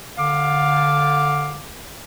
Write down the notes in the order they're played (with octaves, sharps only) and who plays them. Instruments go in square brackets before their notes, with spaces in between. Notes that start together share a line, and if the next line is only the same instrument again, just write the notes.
[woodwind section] D3 F5 D6